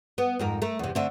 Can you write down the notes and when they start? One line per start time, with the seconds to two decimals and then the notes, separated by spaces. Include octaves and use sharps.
0.18 B3
0.39 F2 G#2 A#4
0.62 A3 A#4
0.79 E2 C3
0.95 D3 A3 C4